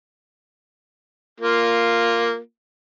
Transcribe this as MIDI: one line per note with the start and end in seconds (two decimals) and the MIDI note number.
1.40 2.38 58
1.40 2.38 65